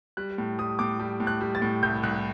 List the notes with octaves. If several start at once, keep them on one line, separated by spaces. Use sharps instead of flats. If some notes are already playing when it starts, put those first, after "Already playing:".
G3 F#6
A2
G3 D#6
A2 D6
G3
A2
F#6
G3
A6
A2
C2 G6
C2 F#6